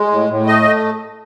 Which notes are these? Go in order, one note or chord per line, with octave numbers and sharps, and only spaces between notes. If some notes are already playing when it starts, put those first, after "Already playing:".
Already playing: G#3
A2
A2
A3 D#5
A3